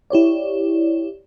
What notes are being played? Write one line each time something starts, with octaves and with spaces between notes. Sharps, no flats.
E4 G4 C#5 D5